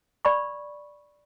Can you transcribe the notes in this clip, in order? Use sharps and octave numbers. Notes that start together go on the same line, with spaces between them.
D5 B5 C#6